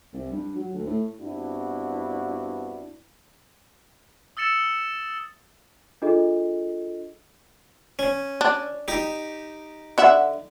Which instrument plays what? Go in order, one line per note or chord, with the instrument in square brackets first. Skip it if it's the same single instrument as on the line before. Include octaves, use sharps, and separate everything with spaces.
[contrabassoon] C2
G2
F#3
D2
A2
[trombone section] G2 B3 C4 D4 E4 F#4
[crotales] D#6 E6 A6 C#7 E7
[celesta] D4 F4 G#4 A4 D#5
[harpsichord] C#4
[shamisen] D4
[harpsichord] D#4 G4
[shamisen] D3 E5 F#5